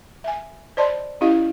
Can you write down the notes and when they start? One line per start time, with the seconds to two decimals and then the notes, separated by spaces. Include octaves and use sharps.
0.24 E5 G#5
0.77 C5 D5 D#5 A5 B5 C6
1.21 C#4 E4 G4 D#5 F5